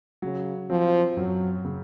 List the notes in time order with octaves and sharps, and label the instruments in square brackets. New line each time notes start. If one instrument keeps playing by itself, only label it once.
[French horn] C#3 [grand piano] F#3
[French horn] F3 [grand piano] C4
[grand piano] F#2 [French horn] F#3
[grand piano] C#3